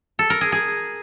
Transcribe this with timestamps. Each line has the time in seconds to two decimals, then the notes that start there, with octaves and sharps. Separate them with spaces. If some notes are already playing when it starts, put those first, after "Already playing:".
0.19 A4
0.30 A#4
0.41 G#4
0.52 G#4